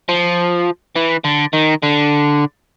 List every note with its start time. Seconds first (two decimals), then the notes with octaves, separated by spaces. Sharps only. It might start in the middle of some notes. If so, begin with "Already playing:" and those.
0.09 F3
0.96 E3
1.25 D3
1.54 D#3
1.83 D3